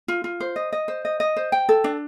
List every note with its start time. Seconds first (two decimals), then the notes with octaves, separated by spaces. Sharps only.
0.08 F4
0.24 F4
0.40 C5
0.56 D#5
0.72 D#5
0.88 C5
1.05 D#5
1.20 D#5
1.36 C5
1.52 G5
1.69 A4
1.84 D4